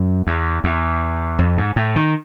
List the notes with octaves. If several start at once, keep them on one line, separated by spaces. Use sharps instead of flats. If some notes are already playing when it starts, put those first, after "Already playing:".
Already playing: F#2
E2
E2
F2
G#2
A2
D#3